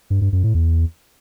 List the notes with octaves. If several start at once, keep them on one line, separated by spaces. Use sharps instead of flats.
G2
G2
F#2
A2
E2